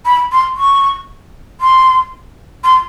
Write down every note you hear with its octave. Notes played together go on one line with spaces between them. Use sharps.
B5
C6
C#6
C6
C6